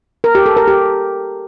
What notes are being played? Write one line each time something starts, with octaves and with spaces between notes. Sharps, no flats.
A#4
G4
A4
A#4
G4